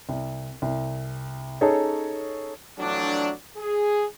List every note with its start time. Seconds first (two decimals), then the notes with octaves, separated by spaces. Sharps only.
0.09 C2
0.62 C2
1.61 C#4 D#4 G#4 A4 C#5
2.79 F2 E3 F#3 A3 D4
3.57 G#4